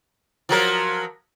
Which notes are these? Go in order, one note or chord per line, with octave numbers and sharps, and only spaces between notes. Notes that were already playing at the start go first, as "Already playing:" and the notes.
F3 F#3 A#4